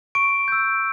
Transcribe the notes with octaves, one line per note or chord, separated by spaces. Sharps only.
C#6 D7
E6 G6